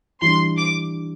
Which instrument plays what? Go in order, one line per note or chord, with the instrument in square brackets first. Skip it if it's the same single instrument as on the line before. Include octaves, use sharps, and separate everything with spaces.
[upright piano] E3 G3 D4 [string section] C6
[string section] D6